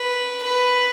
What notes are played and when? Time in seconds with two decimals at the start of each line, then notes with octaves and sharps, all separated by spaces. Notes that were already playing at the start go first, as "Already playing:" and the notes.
Already playing: B4
0.43 B4